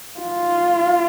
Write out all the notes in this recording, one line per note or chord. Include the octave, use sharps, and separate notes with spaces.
F4